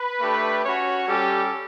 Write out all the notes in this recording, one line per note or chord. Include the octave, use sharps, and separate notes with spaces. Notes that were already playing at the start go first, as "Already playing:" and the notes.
Already playing: B4
A3 D4 G4
C#4 F#4 C#5
G3 C#4 G4 A4